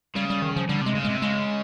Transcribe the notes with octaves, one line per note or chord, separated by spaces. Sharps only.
C#3 G3
G3
D#3
F3
D3 G3
C3 G#3
C#3
C3 G#3
C#3 G#3